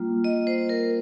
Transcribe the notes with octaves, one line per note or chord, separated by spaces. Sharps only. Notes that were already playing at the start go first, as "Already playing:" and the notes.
Already playing: G3 A#3 F4
D#5
C5
A#4